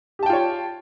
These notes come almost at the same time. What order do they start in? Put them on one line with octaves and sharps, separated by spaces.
G4 A5 G5 F4 C#5